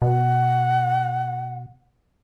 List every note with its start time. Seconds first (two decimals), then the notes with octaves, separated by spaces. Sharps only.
0.02 B2 F#5